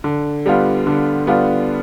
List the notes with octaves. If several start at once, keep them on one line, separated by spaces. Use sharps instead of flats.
D3
G3 B3 D4 F4
D3
G3 B3 D4 F4